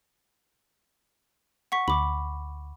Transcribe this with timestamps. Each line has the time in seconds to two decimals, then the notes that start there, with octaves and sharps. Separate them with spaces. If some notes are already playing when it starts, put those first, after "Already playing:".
1.72 F#5 C#6 B6
1.88 D2 B5 D6